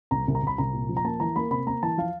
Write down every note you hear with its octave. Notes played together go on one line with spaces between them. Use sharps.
C2 A#5
C2
A#5
C2 B5
C2 A#5
A#2
F3
A#5
A#3 A5
E3 A#5
A#3 B5
C3 B5
A#3 A#5
E3 A5
F3 F5